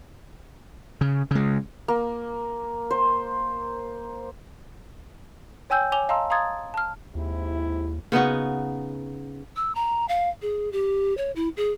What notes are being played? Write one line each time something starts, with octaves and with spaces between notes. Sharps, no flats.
C#3
C#3 G#3
A#3
C5
C#5 G5 G#5 E6 G6
C#5 G#5 D6 F7 G7
D#5 F5 A5 A#5 C6 E6
F5 A#5 C6 D#6 G#6 A6
A5 F6
D#2 G#2 C3 E4
C#3 B3 D#4 F#4
E6
A#5
F5
G#4
G4
C#5
E4
G#4